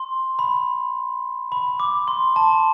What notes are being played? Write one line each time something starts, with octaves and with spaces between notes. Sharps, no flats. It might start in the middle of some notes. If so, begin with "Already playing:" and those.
Already playing: C6
B5
B5
D6
C6
A5